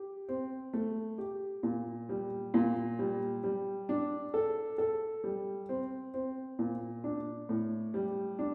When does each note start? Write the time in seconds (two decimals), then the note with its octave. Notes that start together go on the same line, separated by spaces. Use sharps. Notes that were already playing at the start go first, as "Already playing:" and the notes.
Already playing: G4
0.29 C4
0.73 A3
1.18 G4
1.63 A#2
2.09 G3
2.54 A#2
2.99 G3
3.44 G3
3.89 D4
4.34 A4
4.78 A4
5.24 G3
5.69 C4
6.14 C4
6.59 A#2
7.04 D4
7.49 A2
7.94 G3
8.39 D4